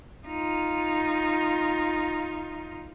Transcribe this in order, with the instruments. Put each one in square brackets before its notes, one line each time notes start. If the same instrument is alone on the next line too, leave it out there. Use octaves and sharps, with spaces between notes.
[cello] D#4 F4